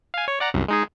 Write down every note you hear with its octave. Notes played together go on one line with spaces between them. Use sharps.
F5 G#5
C#5
D5 F#5 A#5
C2 F#2
G#3 D#4 G#4